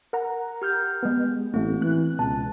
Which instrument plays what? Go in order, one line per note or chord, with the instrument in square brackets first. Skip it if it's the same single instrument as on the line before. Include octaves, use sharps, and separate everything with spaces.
[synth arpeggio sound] A#4 F#5 A#5
[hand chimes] G4 F6 G6
[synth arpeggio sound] G#3 B3
[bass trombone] A1 [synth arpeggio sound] A3 A#3 [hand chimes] C4
[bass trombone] E3 [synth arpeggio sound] F#6
[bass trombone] C#2 [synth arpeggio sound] B2 [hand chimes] A5